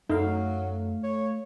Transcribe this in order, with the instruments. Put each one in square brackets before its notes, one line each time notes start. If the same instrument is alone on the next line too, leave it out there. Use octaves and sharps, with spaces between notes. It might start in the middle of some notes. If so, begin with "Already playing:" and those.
[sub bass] F#2 [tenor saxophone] F#3 [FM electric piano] A3 F5 [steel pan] D#4
[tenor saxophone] C#5